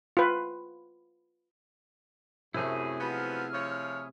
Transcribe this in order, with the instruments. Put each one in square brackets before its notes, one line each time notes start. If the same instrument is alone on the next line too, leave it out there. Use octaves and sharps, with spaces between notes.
[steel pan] F4 B4
[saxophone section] F#2 [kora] C3 A3 [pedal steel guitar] E4 G#4
[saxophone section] F3 F#3 B3 [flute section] F#4 B5
[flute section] F6
[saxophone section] F3 C#5